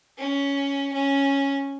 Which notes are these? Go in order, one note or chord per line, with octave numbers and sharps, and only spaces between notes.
C#4
C#4